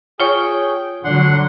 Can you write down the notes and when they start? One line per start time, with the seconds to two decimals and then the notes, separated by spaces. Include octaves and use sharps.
0.20 F4 G#4 C#5 G5 C#6
1.04 D3 F#3 D4 F#5 C6